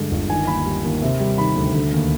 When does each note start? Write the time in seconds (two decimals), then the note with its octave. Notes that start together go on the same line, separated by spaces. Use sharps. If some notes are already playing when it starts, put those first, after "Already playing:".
Already playing: G2 D3 G#3
0.11 G1
0.30 D#3 G#5
0.47 D#2 B5
0.65 G3
0.84 D#2
1.02 C3
1.20 G3
1.38 D#3 B5
1.56 D2
1.75 D3
1.92 D#2